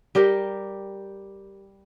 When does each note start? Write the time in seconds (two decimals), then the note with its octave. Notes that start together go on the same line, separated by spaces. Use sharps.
0.15 G3 G4 A#4 G5